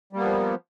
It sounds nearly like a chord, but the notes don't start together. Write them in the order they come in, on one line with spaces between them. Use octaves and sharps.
G3 A#3 B3 F3